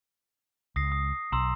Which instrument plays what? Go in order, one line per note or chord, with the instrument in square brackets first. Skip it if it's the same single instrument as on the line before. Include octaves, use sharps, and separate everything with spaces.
[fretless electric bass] C#2 [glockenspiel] D#6 A#6 C7
[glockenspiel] D#6
[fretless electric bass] B1 [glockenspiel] A#5 C6 E6